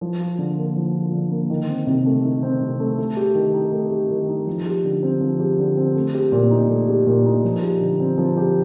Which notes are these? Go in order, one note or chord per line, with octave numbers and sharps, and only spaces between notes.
F3
F4
D3
A#3
F3
F4
D3
A#3
D#3
C4
C3
A3
D#3
C4
C3
A3
A3
G4
D#3
D#4
A3
G4
D#3
D#4
F3
G4
D3
C4
F3
G4
D3
C4
A3
G4
A#2
D#4
A3
G4
A#2
D#4
F3
G4
D3
C4
F3
G4